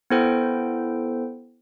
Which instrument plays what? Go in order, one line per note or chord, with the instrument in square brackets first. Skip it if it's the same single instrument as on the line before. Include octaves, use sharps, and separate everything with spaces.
[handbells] B3 E4 A4 C5 G5